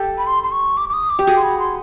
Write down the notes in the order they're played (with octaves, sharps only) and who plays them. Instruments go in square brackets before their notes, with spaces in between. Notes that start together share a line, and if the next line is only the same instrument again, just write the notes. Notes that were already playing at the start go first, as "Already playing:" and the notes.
Already playing: [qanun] G4 A4
[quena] B5
C6
C6
C#6
D6
D6
D#6
D6
[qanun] G4
F#4 G#4
[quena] C6
B5
C6